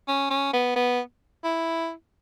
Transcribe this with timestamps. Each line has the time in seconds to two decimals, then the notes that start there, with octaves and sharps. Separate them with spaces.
0.08 C#4
0.31 C#4
0.53 B3
0.76 B3
1.44 E4